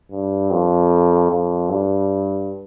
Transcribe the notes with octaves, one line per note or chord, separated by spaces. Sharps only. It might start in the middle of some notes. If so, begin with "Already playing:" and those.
G2
F2
F2
G2